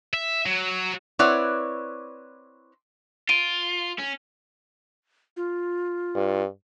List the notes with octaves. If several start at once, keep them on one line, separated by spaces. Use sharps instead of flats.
E5
F#3
C4 E4 B4 C#5 D5 F#5
F4 D7 D#7
C#4
F4
G2